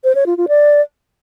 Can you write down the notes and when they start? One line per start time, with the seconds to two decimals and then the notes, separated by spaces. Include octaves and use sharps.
0.04 C5
0.15 C#5
0.26 F4
0.37 F4
0.48 D5